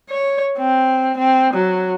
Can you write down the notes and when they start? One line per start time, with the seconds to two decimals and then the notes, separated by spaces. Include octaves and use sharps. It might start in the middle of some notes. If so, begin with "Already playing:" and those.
0.10 C#5
0.58 C4
1.18 C4
1.54 F#3